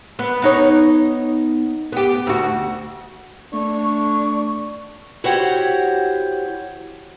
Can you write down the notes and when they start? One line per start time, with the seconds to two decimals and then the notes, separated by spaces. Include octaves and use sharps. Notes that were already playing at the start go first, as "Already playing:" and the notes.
0.19 B3
0.42 B3 D#4 C#5
1.92 B3 G4
2.27 D2 F#4
3.53 A3 D4 C#6
5.24 E4 F#4 G4 C5 C#5 F#5